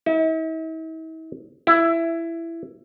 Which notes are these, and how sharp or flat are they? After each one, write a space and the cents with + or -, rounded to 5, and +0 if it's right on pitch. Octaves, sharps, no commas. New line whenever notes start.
E4 -45
E4 +15